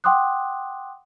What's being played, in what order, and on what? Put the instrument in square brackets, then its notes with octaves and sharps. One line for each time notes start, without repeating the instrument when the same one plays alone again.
[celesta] F#5 G5 C6 D6 D#6 F#6